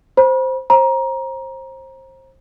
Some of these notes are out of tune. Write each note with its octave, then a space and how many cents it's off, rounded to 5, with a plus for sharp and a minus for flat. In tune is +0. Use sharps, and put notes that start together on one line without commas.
C5 +0 B5 -40
C5 +25 A#5 +20